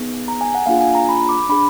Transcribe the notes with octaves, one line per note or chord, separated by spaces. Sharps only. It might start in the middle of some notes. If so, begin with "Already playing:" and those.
Already playing: B3 D#4 G#4
A#5
G#5
F#5
A#3 D4 F4 G#4 F5
G#5
A#5
B5
D6
D4 G#4 B5